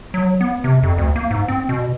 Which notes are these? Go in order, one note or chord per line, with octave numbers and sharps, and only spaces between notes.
F#3
B3
C3
F2
D2
A#3
G#2
C4
B2